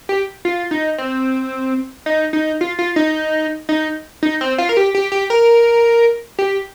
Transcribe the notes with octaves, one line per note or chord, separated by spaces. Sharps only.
G4
F4
D#4
C4
D#4
D#4
F4
F4
D#4
D#4
D#4
C4
F4
A#4
G4
G4
G4
A#4
G4